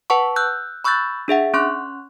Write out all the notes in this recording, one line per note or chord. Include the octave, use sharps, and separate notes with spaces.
B4 F#5 A5 C#6
E6 F#6 G6
B5 C#6 E6 F#6 G6 A6
D4 G#4 E5 F#5
C#4 C6 C#6 F#6